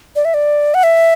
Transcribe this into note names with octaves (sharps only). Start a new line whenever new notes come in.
D5
E5
D5
F#5
E5